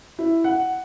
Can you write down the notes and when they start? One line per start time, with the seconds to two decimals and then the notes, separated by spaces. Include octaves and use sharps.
0.18 E4
0.44 F#5